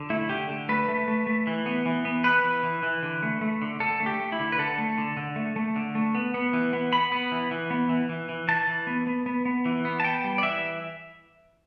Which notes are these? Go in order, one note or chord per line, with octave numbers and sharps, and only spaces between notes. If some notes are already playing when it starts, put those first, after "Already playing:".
Already playing: D3
A3 E4
D3 G4
D3
A3 B4
A3
A3
A3
E3
B3
E3
B3
B3 B4
E3
E3
E3
D3
A3
A3
D3
D3 A4
A3
G4
A3
E4
D3
B4
D3 A4
A3
D3
D3
A3
A3
D3
A3
B3
B3
E3
B3
B3 B5
B3
E3
E3
B3
E3
E3
E3
E3 A5
E3
B3
B3
B3
B3
E3
B3
A5
B3 G5
G3
D5
E3 E5